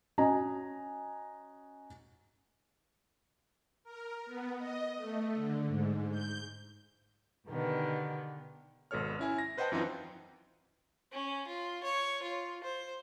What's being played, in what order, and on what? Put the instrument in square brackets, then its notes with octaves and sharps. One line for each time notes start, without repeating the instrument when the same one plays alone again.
[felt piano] C#4 F#4 D#5 G#5 A#5
[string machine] A#4
B3
D#5
A3
D3
G#2
G6
[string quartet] B2 D3 D#3 B3 G4
[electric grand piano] G#1 B2 A4 C#5 F6
C#4 E4 G#5
A#6
B4 C5 D#5 F#5 G5 A5
F#2 E3 C4 D#4 F4
[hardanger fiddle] C#4
F4
C#5
F4
C5